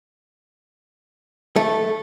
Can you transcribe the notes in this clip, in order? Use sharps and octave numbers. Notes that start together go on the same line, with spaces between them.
A3